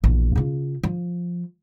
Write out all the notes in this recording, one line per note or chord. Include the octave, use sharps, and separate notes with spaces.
A#1 E2
C#3 F4
F3